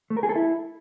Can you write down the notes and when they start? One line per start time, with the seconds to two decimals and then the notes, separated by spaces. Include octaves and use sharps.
0.10 A3
0.17 A#4
0.23 G#4
0.29 A4
0.36 E4